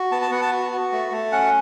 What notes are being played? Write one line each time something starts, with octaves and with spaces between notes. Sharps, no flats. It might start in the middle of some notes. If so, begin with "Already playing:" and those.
Already playing: F#4
B3 A5
A5
B3 F#5
A5
F#4
F#4
A3
A3
C#4 F#5